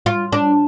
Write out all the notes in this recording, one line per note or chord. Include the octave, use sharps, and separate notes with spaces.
F4
D4